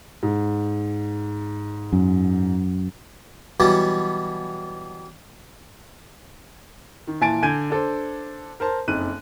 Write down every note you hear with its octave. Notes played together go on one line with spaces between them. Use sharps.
G#2
F#2
B2 E3 F#3 G3 B3
D#3
A#2 E3 G#5 A5 A6 D7
D3 G#5 G6 G#6 D#7
D4 A4 C5
A#4 C5 A5
F#1 F2 D#4 F#6 D#7